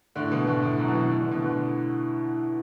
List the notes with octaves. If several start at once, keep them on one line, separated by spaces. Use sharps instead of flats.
A2 D3
B2 E3
A2 D3
A2
F#2 B2
F#3
B2 E3
E3
D3
B2
A2 D3